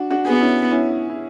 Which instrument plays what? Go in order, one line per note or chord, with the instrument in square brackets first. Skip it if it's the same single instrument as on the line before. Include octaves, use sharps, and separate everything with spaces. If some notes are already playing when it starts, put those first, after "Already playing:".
Already playing: [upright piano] D4 F#4
D4 F#4
[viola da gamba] B3 [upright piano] G#4
[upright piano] F#4
C#4 E4
C#4 E4
E4